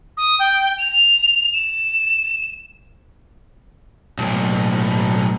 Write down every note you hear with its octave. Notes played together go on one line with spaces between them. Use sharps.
D#6
G5
F7
E7
B1 A2